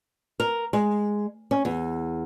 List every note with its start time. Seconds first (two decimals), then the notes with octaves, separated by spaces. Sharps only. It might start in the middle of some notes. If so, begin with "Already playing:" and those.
0.40 A#4
0.73 G#3
1.51 C#4
1.65 E2